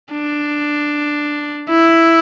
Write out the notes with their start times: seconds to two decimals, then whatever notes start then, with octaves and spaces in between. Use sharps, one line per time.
0.11 D4
1.69 E4